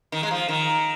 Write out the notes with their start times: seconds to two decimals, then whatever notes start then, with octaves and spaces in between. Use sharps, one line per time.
0.12 D#3
0.23 G#3
0.31 F3
0.48 D#3